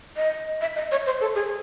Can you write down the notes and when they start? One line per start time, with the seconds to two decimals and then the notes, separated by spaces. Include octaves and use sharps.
0.17 D#5
0.61 E5
0.76 D#5
0.91 C#5
1.06 C5
1.21 A4
1.35 G#4